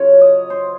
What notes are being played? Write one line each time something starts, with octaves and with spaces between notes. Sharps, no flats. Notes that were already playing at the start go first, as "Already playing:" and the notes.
Already playing: C#3 F#3 F4 C#5
D#5
C5